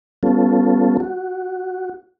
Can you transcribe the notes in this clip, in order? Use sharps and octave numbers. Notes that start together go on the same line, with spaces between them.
G3 B3 C#4 F4 A4
F#4